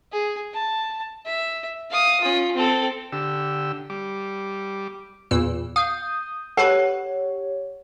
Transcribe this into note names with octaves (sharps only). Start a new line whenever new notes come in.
G#4
A5
E5
F5 D#6
C#4 F4
C4 A4
D3 G4 E6
G3 D6
E2 A#2 E6
F5 D#6 G6
G4 A4 B4 C#5 F#5